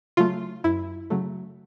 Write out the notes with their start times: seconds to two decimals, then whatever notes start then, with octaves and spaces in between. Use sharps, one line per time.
0.17 C#3 F#3 A3 F4
0.64 F#2 E4
1.10 C#3 F#3 A3